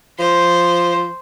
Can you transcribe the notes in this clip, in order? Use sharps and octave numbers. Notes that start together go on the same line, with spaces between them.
F3 C5